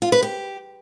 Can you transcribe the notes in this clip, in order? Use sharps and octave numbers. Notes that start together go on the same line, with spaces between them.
F4
B4
G4